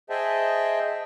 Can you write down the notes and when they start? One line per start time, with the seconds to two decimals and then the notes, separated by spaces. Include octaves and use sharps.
0.10 G#4 C5 D#5 E5 G5 A5